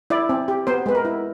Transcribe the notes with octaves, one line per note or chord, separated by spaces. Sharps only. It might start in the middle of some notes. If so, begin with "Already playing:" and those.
E4 D5
C4
G4
B3 C5
G#3 B4
A#4
E4